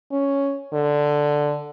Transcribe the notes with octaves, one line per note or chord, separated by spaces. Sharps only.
C#4
D3